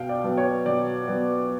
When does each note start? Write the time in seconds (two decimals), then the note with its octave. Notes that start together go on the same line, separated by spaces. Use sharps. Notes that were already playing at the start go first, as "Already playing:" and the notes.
Already playing: B2 F5 G5
0.09 D5
0.24 F#3 B3
0.38 C#5
0.66 B2 D5
1.07 F#3 B3